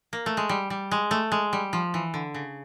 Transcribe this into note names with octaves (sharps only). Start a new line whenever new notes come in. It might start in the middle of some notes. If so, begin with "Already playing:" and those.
A#3
A3
G#3
G3
G3
G#3
A3
G#3
G3
F3
E3
D3
C#3